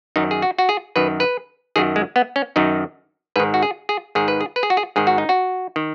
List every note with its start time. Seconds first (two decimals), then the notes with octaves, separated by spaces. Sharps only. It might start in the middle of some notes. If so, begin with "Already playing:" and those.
0.16 F#2 D#3 D#4
0.31 G#4
0.42 F#4
0.58 F#4
0.69 G#4
0.96 F#2 D#3 B4
1.20 B4
1.76 F#2 D#3 G#4
1.96 G#3
2.16 B3
2.36 C#4
2.56 F#2 D#3 D#4
3.36 G#2 D#3 B4
3.54 F#4
3.63 G#4
3.89 G#4
4.15 G#2 D#3 G#4
4.28 B4
4.41 G#4
4.56 B4
4.63 G#4
4.70 F#4
4.77 G#4
4.96 G#2 D#3 G#4
5.07 F#4
5.18 D#4
5.29 F#4
5.76 D#3